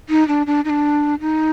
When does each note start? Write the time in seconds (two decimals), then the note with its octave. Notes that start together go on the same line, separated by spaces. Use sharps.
0.09 D#4
0.28 D4
0.47 D4
0.65 D#4
0.69 D4
1.20 D#4